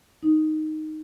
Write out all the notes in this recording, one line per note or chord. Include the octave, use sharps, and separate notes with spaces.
D#4